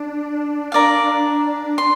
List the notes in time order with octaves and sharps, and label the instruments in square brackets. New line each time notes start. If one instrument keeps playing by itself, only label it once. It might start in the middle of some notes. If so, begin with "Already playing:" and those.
Already playing: [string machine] D4
D4
[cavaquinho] A#4 D5 F5
C6